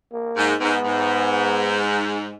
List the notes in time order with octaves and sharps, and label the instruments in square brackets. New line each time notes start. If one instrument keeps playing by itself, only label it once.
[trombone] A#3
[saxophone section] G#2
[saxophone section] G#2 [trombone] B3
[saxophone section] G#2